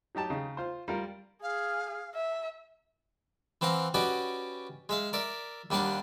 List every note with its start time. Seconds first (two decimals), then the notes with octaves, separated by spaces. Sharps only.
0.15 F#3 D#4 G4 A5
0.30 C#3 D#4
0.57 F4 C5
0.88 G3 F4 A#4
1.43 G#4 F5
2.15 E5
3.61 E3 C4 F5 F#5 A#5
3.94 C#4 F#4 G4 B4 D5 D#5
4.89 G#3 E5 F5
5.13 A#4 D5 E5
5.70 D#2 G3 D4 F5 F#5